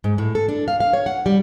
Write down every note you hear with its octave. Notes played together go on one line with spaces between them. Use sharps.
G#2
A2
A4
D4
F5
F5
C#5
F#5
G3